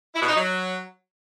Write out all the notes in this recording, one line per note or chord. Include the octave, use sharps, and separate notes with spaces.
E4
B2
D#4
F#3